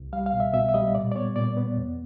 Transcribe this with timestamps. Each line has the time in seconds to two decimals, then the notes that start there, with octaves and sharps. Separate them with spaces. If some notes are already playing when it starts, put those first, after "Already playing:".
Already playing: C2
0.13 G3 F5
0.26 F5
0.33 B2
0.40 E5
0.54 B2 E5
0.69 E5
0.74 G3 D#5
0.95 A#2 D5
1.11 D5
1.15 B3 C#5
1.36 A#2 D5
1.57 B3
1.77 E2